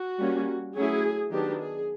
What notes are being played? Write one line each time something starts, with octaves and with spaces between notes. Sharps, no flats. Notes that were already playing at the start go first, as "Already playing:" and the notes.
Already playing: F#4
G3 A#3 C#4
F#3 A3 C#4 E4 G#4
D#3 F#3 B3 D4 G4
G#4